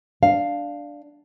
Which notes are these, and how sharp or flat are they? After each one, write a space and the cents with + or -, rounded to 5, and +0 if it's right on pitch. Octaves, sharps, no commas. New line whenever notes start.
D4 +0 F5 +0